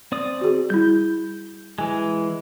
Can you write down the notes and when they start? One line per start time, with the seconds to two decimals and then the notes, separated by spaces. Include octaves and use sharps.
0.12 C4 D5 D#6
0.41 F#4 G#4
0.70 G3 E4 G6
1.78 E3 G#3 G#5